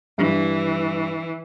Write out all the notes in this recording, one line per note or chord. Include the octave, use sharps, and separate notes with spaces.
G2 E3